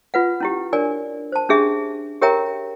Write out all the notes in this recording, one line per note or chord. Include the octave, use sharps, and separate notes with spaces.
F4 B4 F#5
C#4 E4 G4
D4 A#4 C#5 D5 G#5
C5 A5
C#4 D4 G4 G#4 E5
G4 A#4 C#5 E5 G5 A#5